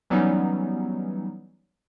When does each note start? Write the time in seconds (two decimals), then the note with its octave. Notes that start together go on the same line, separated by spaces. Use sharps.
0.10 E3 F#3 G3 B3 C#4 D#4